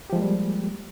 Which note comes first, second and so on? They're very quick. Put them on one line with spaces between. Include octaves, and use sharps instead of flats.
G4 F3 G#3 A#3 G3